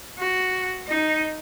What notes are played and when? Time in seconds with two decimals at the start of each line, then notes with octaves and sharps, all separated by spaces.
0.18 F#4
0.88 D#4